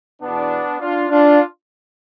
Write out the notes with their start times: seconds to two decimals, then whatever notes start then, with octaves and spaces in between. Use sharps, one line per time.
0.21 E2 B2 B3 D4
0.80 D4 F4
1.10 D4 F4